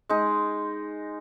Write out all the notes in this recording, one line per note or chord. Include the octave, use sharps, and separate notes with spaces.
G#3 D#4